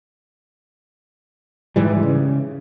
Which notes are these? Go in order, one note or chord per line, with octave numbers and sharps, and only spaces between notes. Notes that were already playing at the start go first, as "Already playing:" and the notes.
G#2 E3 G3
C#3